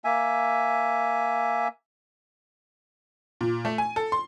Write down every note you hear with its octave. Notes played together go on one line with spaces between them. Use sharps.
A#3 E5 G#5
A#2
A3
G#5
A4
C6